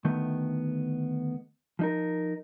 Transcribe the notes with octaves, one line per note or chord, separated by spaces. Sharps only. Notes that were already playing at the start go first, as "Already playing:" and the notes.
D2 D#3 A3 B3
F3 D#4 A#4